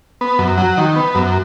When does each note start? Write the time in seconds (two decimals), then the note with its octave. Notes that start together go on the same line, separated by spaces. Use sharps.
0.21 B3
0.39 F#2
0.58 F#3
0.77 D#3
0.96 B3
1.15 F#2